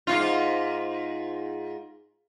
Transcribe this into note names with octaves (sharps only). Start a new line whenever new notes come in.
G#2 B2 F4